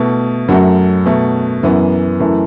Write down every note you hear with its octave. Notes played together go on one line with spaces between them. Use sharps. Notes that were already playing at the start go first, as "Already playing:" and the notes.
Already playing: B2 A3 E4
F#2 F#3 A3 F#4
B2 A3
F#2 E3 B3
F#2 E3 A3